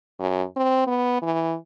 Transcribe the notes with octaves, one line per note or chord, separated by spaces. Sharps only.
F#2
C4
B3
E3